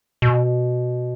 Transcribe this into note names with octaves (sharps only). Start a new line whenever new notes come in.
B2